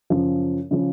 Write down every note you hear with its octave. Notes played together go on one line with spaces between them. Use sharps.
F#2 C#3 F3
C#3 F3